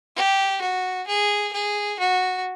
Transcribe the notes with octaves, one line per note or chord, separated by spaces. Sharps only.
G4
F#4
G#4
G#4
F#4